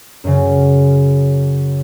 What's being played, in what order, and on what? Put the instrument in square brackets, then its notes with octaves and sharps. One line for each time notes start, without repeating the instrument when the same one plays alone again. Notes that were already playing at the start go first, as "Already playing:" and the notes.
[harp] F#2 C#3